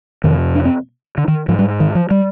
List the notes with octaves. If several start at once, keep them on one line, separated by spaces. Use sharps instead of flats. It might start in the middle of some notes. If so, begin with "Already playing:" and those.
F2 C3 D#3
D4
C4
D3
D#3
G#2 F3
G3
D#3
F3
G3